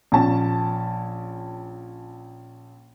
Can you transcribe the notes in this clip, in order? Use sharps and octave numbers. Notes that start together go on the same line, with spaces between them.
A#1 C#4 A5